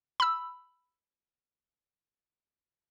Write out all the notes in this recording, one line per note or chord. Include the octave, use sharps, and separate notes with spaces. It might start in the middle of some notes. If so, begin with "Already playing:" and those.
B5 E6